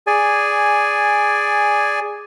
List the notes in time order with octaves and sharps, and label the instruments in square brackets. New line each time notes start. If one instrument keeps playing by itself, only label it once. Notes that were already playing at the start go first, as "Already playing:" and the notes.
[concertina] G#4 D5 G#5